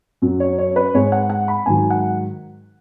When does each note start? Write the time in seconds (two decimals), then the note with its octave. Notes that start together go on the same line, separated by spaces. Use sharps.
0.22 F#2 F#3
0.40 C#5
0.59 C#5
0.76 B4
0.94 G#2 G#3 C#5
1.12 F#5
1.30 F#5
1.48 B5
1.66 G#2 D#3 F#3 G#5
1.90 F#5